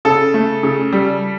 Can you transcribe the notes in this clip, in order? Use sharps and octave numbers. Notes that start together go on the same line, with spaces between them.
C#3 A4
A3
C#3
G3